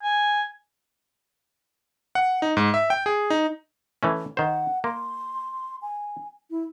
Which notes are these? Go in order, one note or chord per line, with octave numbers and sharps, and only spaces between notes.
G#5
F#5
D#4
G#2
E5
G5
G#4
D#4
E3 A3 C#4
D#3 C5 F#5
A#3 C6
G#5
E4